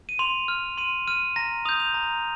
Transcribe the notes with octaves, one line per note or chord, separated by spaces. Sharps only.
D#7
C6 F7
F6
C6 D#7
F6 D#7
A#5 A#6
D#6 G6 F7
F7
A#5